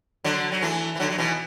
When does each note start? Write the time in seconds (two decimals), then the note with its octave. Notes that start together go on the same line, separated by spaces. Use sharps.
0.24 D3 F#3
0.52 F#3
0.62 E3 A3
0.95 E3
1.00 D3 F#3
1.10 F#3
1.18 B2 E3